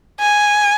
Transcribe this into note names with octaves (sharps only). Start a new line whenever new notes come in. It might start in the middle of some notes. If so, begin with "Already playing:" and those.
G#5